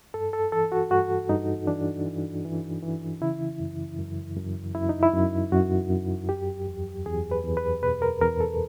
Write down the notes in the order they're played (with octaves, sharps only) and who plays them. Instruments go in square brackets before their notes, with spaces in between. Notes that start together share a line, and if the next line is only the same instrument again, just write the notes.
[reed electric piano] G2 A4
A4
E3 A4
F#4
G2 F#4
G2 D#4
E3 D4
E3
E3
E3
C#3 E4
F#2
F#2
F#2
F#2 E4
D#4
E4
F#2
F#2 F#4
F#2
F#3 G4
E2
E2 G#4
B4
E2
B4
B2 B4
A#4
E2 A#4
A4